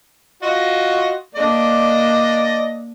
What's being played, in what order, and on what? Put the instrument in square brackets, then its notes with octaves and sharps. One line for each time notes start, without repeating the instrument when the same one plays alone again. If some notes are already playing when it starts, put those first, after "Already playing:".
[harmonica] F4 F#4 D#5
[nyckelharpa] A#3 D4 [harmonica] D5 D#5